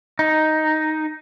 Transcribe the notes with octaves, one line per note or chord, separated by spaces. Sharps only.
D#4